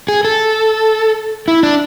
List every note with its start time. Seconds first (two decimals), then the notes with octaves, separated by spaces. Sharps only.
0.08 G#4
0.25 A4
1.48 E4
1.63 D4